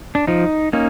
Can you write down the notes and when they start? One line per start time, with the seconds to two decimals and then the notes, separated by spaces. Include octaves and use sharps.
0.15 D4
0.27 F3 D#4
0.73 A#3 C#4 D#4